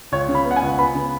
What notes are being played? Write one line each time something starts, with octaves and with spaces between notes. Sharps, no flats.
C#2 C#5
C#3
B5
B3
F#5
G#5
C#2
B3 B5
C#3